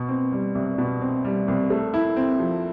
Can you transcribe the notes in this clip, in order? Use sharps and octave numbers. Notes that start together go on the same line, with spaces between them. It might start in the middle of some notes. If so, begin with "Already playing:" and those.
Already playing: B2
C4
G3
C2
B2
C4
G3
C2
A3
E4
C4
F3